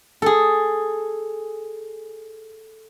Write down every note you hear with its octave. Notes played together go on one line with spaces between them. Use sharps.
G#4 A4